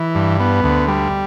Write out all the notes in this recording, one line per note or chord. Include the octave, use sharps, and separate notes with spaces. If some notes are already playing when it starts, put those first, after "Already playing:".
Already playing: E3
G2
B3
D2
G3